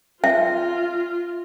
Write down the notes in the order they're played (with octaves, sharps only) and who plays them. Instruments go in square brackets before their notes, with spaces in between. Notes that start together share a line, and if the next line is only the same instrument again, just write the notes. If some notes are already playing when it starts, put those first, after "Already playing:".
[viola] F4 [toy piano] E5